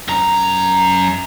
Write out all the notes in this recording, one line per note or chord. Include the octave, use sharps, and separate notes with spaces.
F#2 A#5